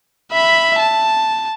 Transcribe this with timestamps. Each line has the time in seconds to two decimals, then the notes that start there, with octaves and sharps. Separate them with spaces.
0.32 E5 B5
0.79 A5